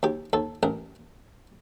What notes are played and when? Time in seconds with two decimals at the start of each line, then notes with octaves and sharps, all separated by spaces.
0.03 D#2 G4
0.33 D#2 A4
0.63 A1 A#4